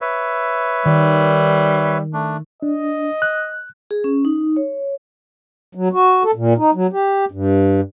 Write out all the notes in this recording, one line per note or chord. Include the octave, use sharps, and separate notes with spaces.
B4 C#5 E5
D#3 G3
A3 D4
D4 D#5
F#6
G#4
C#4
D#4
C#5
F#3
F#4
A4
A#2
D#4
F#3
G4
G2